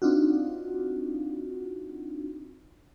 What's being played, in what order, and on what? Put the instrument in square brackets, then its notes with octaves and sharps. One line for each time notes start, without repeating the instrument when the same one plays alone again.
[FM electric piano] C4 D4 D#4 F4 F#4